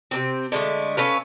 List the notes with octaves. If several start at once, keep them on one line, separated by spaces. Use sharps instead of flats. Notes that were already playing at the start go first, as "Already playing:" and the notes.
C3 A#3 C4
D3 G#3 A3
C#4 A4 B4 F5